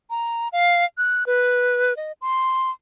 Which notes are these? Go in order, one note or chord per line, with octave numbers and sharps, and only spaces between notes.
A#5
F5
F#6
B4
D#5
C6